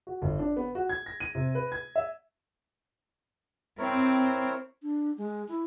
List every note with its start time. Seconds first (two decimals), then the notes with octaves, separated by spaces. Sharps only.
0.07 F#4
0.22 G1
0.39 D4
0.56 B3
0.75 F#4
0.89 G#6
1.06 A#6
1.20 D#7
1.35 C3
1.55 B4
1.72 G#6
1.96 E5
3.78 C4 E4 A#4 C#5
4.82 D4
5.18 G#3
5.48 E4